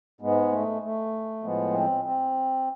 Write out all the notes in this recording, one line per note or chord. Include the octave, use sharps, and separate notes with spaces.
G#2 G#3 B3
A3
A3
A2 F3 G#3 B3
C4
C4